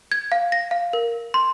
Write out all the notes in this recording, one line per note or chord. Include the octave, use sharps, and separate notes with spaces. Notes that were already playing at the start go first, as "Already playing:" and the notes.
G#6
F5
A#6
F5
A#4
C6